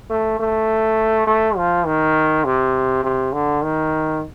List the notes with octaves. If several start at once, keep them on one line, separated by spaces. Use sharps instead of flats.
A3
A3
A3
F3
D#3
C3
C3
D3
D#3